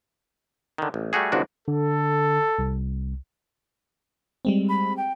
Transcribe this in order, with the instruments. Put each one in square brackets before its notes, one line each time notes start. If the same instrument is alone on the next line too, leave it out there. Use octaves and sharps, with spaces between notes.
[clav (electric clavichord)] D3 D#3
A1
G3 A3 F#4 G#4
G#1 C#2 G#2 G#3 D4 F#4
[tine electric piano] D3 [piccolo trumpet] A4
[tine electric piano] C2
[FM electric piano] G3 G#3 C4
[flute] B5
G5